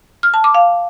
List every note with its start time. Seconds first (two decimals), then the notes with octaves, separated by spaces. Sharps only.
0.23 F6
0.34 A5
0.44 D6
0.55 F5